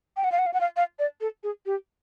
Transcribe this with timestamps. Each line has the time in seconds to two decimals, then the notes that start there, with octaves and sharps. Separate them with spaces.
0.17 G5
0.24 F#5
0.32 F5
0.39 F#5
0.46 F5
0.53 F#5
0.60 F5
0.77 F5
0.99 D5
1.21 A4
1.43 G#4
1.66 G4